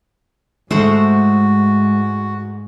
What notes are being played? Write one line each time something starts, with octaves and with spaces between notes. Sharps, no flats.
G#2 G#3 A3 F#4 C5 F#5